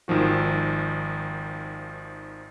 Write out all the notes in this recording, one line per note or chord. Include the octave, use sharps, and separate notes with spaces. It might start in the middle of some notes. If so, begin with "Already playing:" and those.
G#1 D#3 F3 F#4